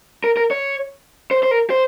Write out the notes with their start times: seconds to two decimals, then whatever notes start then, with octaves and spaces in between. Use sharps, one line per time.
0.24 A#4
0.37 A#4
0.51 C#5
1.31 C5
1.43 C5
1.51 A#4
1.70 C5